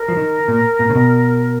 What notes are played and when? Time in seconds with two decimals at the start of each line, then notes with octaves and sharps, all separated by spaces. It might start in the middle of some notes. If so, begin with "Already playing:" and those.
Already playing: A#4
0.08 F3
0.17 D#3
0.48 A#2
0.79 A#2
0.90 C#3
0.95 B2